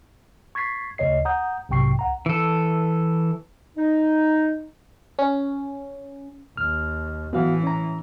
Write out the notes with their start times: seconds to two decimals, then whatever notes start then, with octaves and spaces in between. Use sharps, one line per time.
0.55 C#6 G#6 A6 B6 C7
0.98 D2 C#3 C#5 D#5 C7
1.25 F#5 A#5 D#6 G6
1.69 B1 G#2 C3 G5 C#6 C7
1.99 C2 F#5 A#5
2.26 E3 A4
3.77 D#4
5.19 C#4
6.57 D#2 F6
7.33 A2 E3 B3 F#4 F5
7.64 C#4 A#5